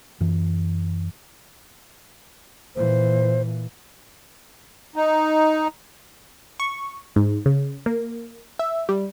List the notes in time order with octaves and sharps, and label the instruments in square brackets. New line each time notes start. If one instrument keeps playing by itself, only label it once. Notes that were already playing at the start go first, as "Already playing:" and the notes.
[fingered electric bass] F#2 E3
[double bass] A#2 E3 [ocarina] C5
[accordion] D#4
[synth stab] C#6
G#2
C#3
A#3
E5
G3